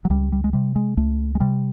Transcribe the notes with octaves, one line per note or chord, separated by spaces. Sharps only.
F#3
C#2 G3
G3
G#3
C3 G3
G#3
C#2 A3
G#3
C3 G3